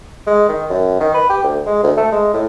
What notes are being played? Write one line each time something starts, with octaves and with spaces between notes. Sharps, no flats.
G#3
D#3
F#2
D#3
B4
G4
D2
G#3
D2
A3
G#3
A2